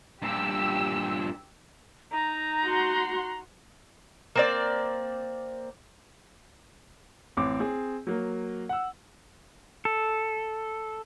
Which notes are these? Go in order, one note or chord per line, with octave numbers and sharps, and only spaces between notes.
G2 A#2 G4 E6
D#4 A#5
F#4 F#5 C6
A#3 C4 D5
A1 C4 D6
C4 G#4
F#3 A#3
F#5 E6
A4